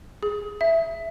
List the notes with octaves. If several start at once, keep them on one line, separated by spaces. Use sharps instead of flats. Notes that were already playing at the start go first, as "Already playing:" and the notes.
G#4
E5